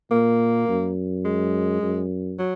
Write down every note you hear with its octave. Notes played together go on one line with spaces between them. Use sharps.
A#2 A#3
F#2
G#3
F#2
F#3